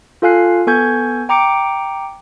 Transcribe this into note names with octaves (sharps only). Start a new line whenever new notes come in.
F4 A4 F5 G#5 F#6 C7
B3 A4 G#5 C#6 G6 G#6
G5 A#5 D6 C#7 D7